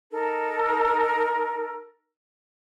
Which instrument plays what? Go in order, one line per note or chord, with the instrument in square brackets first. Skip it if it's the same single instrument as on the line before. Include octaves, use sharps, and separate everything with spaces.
[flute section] D#4 A4 A#4